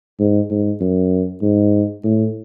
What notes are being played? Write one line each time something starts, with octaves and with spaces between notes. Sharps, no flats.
G#2
G#2
F#2
G#2
A2